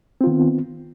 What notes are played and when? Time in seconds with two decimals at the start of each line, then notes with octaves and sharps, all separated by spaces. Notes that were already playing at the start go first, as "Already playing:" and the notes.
0.21 C4
0.24 F4
0.27 D#3
0.30 B3